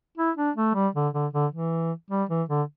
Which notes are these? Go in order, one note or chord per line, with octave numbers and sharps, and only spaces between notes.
E4
D4
A3
G3
D3
D3
D3
E3
G3
E3
D3